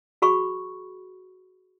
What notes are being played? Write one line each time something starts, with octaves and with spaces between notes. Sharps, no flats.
F#4 G#4 B5 C#6